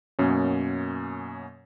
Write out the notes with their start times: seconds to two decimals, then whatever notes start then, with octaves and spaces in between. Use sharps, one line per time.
0.19 F#2 B2 A#3 C#4